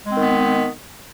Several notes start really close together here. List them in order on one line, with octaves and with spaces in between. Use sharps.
G#3 C4 D#3 B3